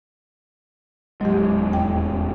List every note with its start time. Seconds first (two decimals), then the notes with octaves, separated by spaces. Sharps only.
1.21 D#1 A1 F#3 G#3 G4
1.71 E2 G5